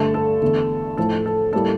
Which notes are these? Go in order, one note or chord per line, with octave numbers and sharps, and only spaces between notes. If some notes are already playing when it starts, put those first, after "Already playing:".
Already playing: G2 D3 A3 A4
A4
E2 D3 A3
A2 F3 A3 A4
A4
A2 G3 A#3 A4